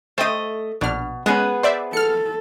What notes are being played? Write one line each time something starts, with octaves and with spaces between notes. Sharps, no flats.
A3 C5 D#5 G5 D#6
A#1 B2 D4 F6
G#3 B3 C#4 G#4 B4
C5 D5 E5
A4 F6 C#7